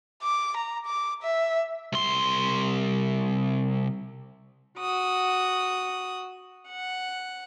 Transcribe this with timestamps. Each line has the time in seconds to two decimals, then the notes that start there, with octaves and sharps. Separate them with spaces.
0.23 D6
0.57 A#5
0.86 D6
1.22 E5
1.93 C2 C6
4.79 F#4 D#6
6.69 F#5